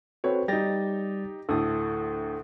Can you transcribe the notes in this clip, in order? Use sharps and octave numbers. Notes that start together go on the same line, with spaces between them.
C4 F#4 A4 B4 C#5
G3 D#4 G4 A6 A#6
D2 A2 A4 D#6